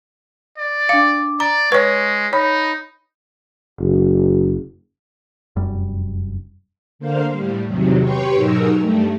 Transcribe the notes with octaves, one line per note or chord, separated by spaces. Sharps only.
D5
D4 F5 D6
D5 A#5
G#3 B4 C#5 C#6
D#4 C#5 B5
F#1
F1 F#2 G3
D3 A#3 C5 F5
A2 G3
E2 C3 D#3 F#3
G4 B4 C#5 G5 C6 C#6
G#2 B2 F#3 D#4 A#4 E6
G2 G3 A3